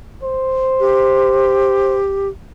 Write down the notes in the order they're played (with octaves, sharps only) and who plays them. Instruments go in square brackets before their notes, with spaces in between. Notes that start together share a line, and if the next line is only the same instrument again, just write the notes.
[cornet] C5
[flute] G4